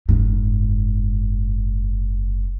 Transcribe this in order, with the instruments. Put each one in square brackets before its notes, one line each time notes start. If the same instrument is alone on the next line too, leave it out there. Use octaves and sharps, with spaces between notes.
[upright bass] F#1 G#2